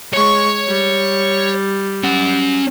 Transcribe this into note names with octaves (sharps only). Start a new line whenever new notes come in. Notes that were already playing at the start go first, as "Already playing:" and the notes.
G#3 C#5 C#6
G3
C#4 F#5